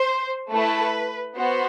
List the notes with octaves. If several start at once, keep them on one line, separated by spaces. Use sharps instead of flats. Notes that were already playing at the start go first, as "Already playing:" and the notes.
Already playing: C5
A3 E4 A4 B4
B3 F#4 C5